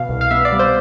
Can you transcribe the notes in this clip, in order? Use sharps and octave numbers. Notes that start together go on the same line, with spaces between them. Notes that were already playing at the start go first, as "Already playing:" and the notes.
Already playing: B2 F5
C2
F5
B3 E5
D5
G3
C5